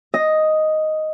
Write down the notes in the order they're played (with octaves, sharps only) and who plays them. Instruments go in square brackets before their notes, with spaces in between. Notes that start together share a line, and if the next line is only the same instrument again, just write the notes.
[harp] D#5